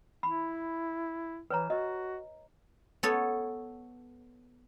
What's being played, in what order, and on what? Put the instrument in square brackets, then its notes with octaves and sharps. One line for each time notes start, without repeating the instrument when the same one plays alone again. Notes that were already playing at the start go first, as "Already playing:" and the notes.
[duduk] E4 [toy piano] B5
[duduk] E3 [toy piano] B4 C#5 A#5
[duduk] F#4 [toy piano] D#5
[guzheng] B3 A4 C#5